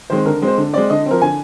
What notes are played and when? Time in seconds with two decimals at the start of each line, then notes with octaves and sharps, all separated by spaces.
0.10 D#3 G#3 C4 C5
0.25 D3 A#4
0.42 G#3 C4
0.48 C5
0.58 D3
0.73 G#3 C4 D5
0.90 D3 D#5
1.06 F3 C4 A#4
1.22 D3 G#5